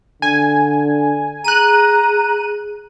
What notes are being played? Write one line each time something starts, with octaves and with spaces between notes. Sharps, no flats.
D3 G#5
G#4 A#5 F#6 D#7